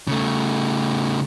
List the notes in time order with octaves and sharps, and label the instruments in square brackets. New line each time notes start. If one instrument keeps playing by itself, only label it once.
[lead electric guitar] C#3 A3